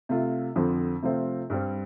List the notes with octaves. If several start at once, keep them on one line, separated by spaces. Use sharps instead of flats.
C3 A3 F4
F2 D3 F3 C4
C3 F3 A3 C4 F4
G2 G3 C4